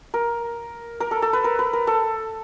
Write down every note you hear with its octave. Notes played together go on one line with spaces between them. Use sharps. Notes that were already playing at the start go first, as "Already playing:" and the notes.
A#4
A#4
A4
A4
B4
A#4
B4
A#4
A4